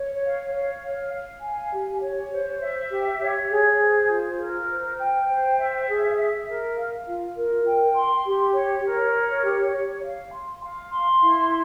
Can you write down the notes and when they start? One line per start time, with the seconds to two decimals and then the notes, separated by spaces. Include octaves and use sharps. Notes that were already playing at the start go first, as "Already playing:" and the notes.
Already playing: C#5
0.23 F5
0.53 C#5
0.82 F5
1.12 F5
1.41 G#5
1.71 G4
2.01 C#5
2.31 C5
2.61 E5
2.90 G4
3.19 C#5
3.49 G#4
3.79 C5
4.09 F4
4.38 A#4
4.68 C5
4.98 G5
5.27 C5
5.57 E5
5.87 G#4
6.17 E5
6.46 A#4
6.76 F5
7.06 F4
7.35 A#4
7.65 G5
7.94 C6
8.24 G4
8.54 C#5
8.84 A#4
9.13 C#5
9.43 G4
9.72 C#5
10.02 F5
10.32 C6
10.62 F5
10.91 C6
11.21 E4